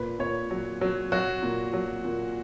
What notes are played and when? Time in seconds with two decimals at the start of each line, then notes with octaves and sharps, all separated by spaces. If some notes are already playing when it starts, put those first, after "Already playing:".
Already playing: A#2 B4
0.19 A#2 C#5
0.51 F#3
0.81 F#3
1.12 F#3 F#4
1.42 A#2
1.73 F#3
2.04 A#2